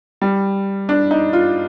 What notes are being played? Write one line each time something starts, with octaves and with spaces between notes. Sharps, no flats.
G3
D4
D#4
F4